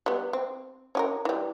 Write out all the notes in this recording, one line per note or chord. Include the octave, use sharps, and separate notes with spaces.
G3 B3
C4
C#4 G4 A#4
E3 G3